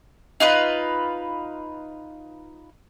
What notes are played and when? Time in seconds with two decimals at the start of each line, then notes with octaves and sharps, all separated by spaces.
0.40 D#4 F4 B4